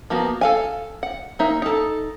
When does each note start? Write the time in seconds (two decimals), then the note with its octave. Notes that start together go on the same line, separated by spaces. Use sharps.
0.10 F3 A#3 B3 F#4
0.41 A4 F5 G#5
1.03 F#5
1.39 A#3 D#4 E5
1.62 D#4 A4